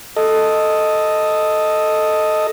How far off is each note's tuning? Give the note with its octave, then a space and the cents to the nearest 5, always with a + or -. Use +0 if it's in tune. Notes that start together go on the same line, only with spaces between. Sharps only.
A4 +0 D#5 +0